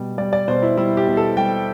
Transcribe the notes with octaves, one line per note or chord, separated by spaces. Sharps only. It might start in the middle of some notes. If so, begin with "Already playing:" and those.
Already playing: B2 G3
G3 D5
D5
B2 C5
E4
G3 E4
G4
B2
A4
G3 G5